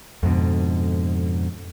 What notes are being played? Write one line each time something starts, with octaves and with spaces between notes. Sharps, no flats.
F2 G#2 B2 D3